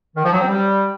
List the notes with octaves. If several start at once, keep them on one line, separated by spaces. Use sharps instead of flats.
D#3
F3
F#3
C4
G3